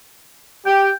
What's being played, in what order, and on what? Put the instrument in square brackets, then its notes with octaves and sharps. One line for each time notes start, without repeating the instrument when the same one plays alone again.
[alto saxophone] G4 [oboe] G5